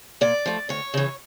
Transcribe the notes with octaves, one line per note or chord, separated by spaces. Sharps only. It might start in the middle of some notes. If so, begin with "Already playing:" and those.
A#2 D5
F3 A3
D2 C#5
C#3 E3